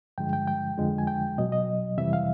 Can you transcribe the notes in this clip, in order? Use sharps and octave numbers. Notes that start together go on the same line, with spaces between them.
G2 D3 F3 G#3 G5
G5
G5
F2 D3 F3 G#3
G#5
G5
B2 F#3 D#5
D#5
F2 C3 E3 G3 E5
F5